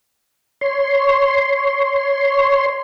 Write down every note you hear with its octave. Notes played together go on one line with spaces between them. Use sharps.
C#5 C6